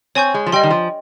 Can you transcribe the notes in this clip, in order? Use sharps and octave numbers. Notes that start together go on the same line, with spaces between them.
C4 C#5 G#5 C#6 G6
G#3
F3
G3 D#5 G5 C6
D#3
F3